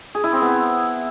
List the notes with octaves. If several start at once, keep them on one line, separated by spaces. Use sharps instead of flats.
G#4
E4
C4
B3